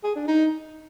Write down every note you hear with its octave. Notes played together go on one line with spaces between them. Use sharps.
G#4
D4
D#4